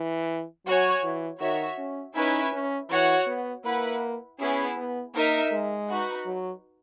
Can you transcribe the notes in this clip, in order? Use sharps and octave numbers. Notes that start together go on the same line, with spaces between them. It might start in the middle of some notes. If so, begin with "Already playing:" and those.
Already playing: E3
F#3 F#4 C#5 G#5
E3
D#3 F#4 C#5 E5
C#4
C#4 D#4 E4 B4 E5 G#5
C#4
E3 F#4 C#5 F#5
B3
A#3 E4 B4 F#5
B3 C#4 E4 G#4
B3
A#3 D#4 A#4 E5
G#3
D#4 F#4 B4 F#5
F#3